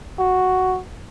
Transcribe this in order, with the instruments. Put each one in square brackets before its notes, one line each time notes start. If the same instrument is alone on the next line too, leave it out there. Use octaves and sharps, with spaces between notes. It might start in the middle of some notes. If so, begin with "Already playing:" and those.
[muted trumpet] F#4